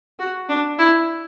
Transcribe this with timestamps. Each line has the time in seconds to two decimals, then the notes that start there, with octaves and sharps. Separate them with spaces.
0.19 F#4
0.49 D4
0.79 E4